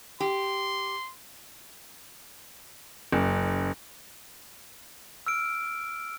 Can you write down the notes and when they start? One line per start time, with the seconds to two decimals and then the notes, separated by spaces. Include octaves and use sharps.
0.20 G4 C6
3.12 F#1
5.26 E6 F6 D7